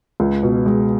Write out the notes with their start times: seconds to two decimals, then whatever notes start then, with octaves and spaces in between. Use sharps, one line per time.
0.20 C#2
0.43 B2
0.66 G#3